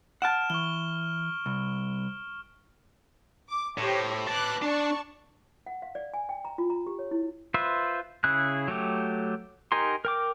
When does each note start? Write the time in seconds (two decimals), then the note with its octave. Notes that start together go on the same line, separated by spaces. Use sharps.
0.22 F#5 A5 F6 D7 E7
0.50 E3 C#6 G7
1.46 C2
3.48 D6
3.78 A2 G4 C5 C#5
4.27 B4 A5 D6 F#6
4.62 D4 D5 A5 C#6
5.66 F#5
5.82 F5
5.95 D5
6.14 G#5
6.29 G5
6.45 A#5
6.58 F4
6.70 A#5
6.87 G4
6.99 C#5
7.11 E4
7.54 F4 B4 C5 E5
8.24 C#3 E4 G#4 F#6
8.68 F#3 A3 G4
9.72 D#4 G4 A#4 G#5 C6
10.05 A#4 G5 D6